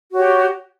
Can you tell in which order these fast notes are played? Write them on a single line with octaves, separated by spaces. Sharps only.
F#4 C#5 G4